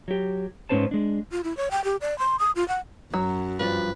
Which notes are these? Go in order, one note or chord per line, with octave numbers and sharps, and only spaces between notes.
F#3 G4
G#2 G3 C#4 B4 C5 A5
G#3 D4
F4
E4
C#5
G5
G4
D5
C6
D#6
F4
F#5
F#2 F#3
G2 F3 B4 D5